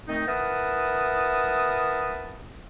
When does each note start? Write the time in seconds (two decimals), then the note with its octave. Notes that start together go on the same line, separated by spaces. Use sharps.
0.08 D#3 A3 C4 D#4
0.28 E4 A#4 B4 F#5 A5 D#6